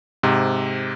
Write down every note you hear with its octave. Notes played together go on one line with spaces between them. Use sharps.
G#2 C3